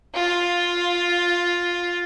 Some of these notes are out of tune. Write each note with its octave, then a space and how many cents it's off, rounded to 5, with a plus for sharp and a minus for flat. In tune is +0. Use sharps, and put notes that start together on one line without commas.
F4 +5